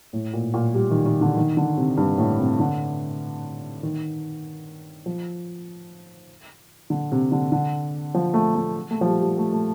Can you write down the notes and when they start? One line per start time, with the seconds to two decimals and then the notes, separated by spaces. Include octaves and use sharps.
0.13 A2
0.33 A#2
0.54 A#2
0.75 G3
0.91 D#3
1.06 D#3
1.21 D3
1.37 D#3
1.57 D3
1.77 C3
1.97 G2
2.18 A2
2.40 C3
2.60 D3
3.83 D#3
5.06 F3
6.90 D3
7.12 C3
7.32 D3
7.52 D3
8.14 F3
8.34 A3
8.55 A3
8.91 A3
9.01 F3
9.06 G3
9.22 G3
9.38 A3
9.53 A3